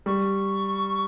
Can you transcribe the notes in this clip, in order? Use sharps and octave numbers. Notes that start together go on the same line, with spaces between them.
G3 C#6